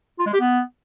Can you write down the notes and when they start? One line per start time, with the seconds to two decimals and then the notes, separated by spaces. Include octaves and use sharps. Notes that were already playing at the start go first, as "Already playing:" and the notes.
0.19 F4
0.26 G#3
0.33 G4
0.40 B3